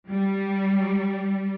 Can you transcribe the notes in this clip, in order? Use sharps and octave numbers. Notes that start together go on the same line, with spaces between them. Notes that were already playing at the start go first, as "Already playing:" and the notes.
G3